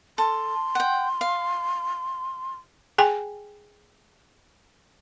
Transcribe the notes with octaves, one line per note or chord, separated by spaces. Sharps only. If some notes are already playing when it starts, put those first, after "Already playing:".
A4 C6
F#5 G5
F5
G#4 G5 G#5